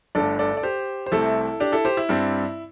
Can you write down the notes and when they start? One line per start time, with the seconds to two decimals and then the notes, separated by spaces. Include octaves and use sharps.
0.15 G1 G2 D3 A3 A4 D5
0.39 A4 D5
0.57 D5
0.63 G4 C5
1.06 C5
1.12 C2 C3 A3 C4 E4 A4
1.60 D4 G4
1.72 E4 A4
1.85 G4 C5
1.97 E4
2.09 G2 G3 C4